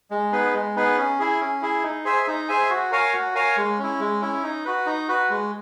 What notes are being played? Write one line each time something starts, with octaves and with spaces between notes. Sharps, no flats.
G#3
B3 D#4 G#4 B4
G#3
B3 D#4 G#4 B4
C#4
E4 G#4
C#4
E4 G#4
D#4
G#4 C5 E5 G#5
D#4
G#4 C5 E5 G#5
F#4
A#4 C#5 F5 G#5
F#4
A#4 C#5 F5 G#5
G#3
C#4 E4
G#3
C#4 E4
D#4
F#4 B4
D#4
F#4 B4
G#3